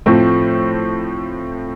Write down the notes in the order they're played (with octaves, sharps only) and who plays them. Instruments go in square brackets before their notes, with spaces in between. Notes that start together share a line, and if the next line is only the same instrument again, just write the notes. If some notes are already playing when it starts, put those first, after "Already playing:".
[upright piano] A2 F3 A3 C4